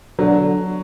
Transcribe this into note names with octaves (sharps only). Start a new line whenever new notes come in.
D3 F#3